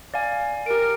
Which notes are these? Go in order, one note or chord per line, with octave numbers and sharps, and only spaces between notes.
D5 F5 G#5
G4 A#4 D7